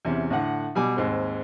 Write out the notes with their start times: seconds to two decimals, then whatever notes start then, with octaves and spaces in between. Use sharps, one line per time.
0.05 E2 C3 C#4
0.30 A2 D3 F#5
0.75 B2 G3 G#5 D6
0.96 D#2 G#2 C4